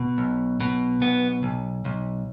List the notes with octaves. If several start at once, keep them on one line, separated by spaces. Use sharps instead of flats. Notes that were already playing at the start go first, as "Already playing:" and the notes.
Already playing: B2
B1
B2
B1 B3
B1
B1